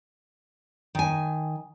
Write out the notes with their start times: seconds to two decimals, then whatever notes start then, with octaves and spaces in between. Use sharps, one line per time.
0.95 D#3 G#5